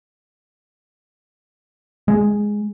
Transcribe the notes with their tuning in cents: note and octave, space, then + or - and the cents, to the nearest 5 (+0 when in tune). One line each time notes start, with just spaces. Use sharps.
G#3 +0